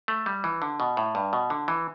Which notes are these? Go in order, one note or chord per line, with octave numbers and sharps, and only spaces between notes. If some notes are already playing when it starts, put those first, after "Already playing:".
A3
G3
E3
D3
B2
A2
G2
B2
D3
E3